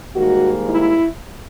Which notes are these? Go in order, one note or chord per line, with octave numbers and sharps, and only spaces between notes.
G#2 D#3 G3 A#3 F#4
E4